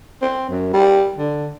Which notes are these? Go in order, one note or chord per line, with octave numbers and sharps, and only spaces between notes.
C4
F#2
G3
D3